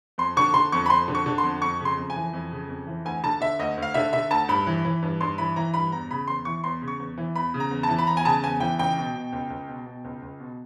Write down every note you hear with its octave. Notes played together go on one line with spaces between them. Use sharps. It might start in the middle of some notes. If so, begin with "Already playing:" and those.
F2 C6
D3 C#6
D3 C6
F2 C#6
B5
F2 C6
D3
C#6
D3
C6
F2
F2 C#6
C#3 C6
F2
G#5
E3
F2
C#3
F2
E3
D2 G#5
D3 A5
D3 E5
D2 D#5
D2
F5
D3 E5
D3 E5
D2 A5
G2 B5
E3
E3
G2
G2 C6
E3 B5
E3 A#5
G2 B5
E2 A#5
C#3 B5
E2 C6
E3 C#6
E2 C6
C#3
C#6
E2
E3
E2 B5
C#3
A#5
E2
A5
E3
B5
E2 A#5
G#5
C#3 A5
E2 G#5
E3 G5
C#2 G5
B2
B2
C#2
C#2
B2
B2
C#2
C#2
B2